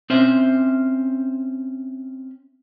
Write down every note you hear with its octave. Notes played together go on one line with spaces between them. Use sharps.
C4 C#4 C5 E5